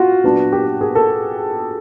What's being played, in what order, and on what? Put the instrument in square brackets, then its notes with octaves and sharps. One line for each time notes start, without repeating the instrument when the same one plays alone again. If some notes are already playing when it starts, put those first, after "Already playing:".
Already playing: [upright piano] F4 F#4
A#2 F#3 B3 D4
G4
G#4
A4